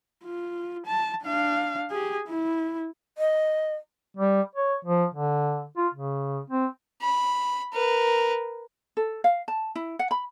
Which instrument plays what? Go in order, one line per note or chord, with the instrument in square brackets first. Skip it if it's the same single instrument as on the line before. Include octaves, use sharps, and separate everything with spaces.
[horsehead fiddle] F4
A5
D4 F5
G4 G#4
E4
[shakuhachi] D#5
[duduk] G3
C#5
F3
D3
F4
C#3
C4
[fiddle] B5
A#4 B4
[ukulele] A4
F5
A5
E4
F#5
B5